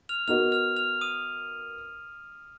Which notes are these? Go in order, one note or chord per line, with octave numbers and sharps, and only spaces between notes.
F6 F7
B3 D#4 F#4 A#4 D#5 F6 F7
F6 F7
F6 F7
D#6 D#7